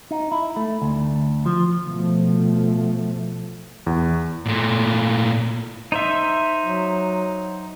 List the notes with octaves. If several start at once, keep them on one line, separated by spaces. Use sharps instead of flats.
D#4
E4
A3
D2
F3
B2 F3 A3
E2
A#2 A3
D#4 C5 E5
F#3